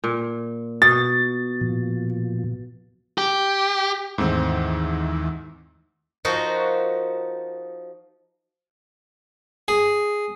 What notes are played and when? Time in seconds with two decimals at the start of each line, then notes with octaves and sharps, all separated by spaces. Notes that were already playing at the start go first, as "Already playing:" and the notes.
0.04 A#2
0.82 B2 A6
1.61 A#2 F3
3.18 G4
4.18 D#2 G#2 E3 A3 C4
6.25 F3 D#4 F#4 A#4
9.68 G#4